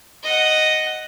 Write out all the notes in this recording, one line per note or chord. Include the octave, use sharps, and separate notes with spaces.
D#5 F#5